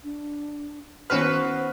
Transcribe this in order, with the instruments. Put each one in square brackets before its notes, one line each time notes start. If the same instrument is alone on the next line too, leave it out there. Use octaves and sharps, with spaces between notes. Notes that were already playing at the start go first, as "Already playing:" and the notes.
[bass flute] D4
[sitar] D#3 F#4 B4 [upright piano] B3 C#4 F6 [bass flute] C5